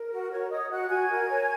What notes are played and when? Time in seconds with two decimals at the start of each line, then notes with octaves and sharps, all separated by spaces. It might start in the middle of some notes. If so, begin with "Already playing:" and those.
Already playing: A#4
0.12 F#4
0.31 A#4 C#5 C#6
0.50 C#5 D#5 D#6
0.70 F#4 F#5 F#6
0.89 F#4 G#5 G#6
1.09 A#4
1.28 C#5